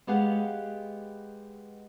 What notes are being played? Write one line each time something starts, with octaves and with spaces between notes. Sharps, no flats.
G#3 B3 G4 G#4 F5 F#5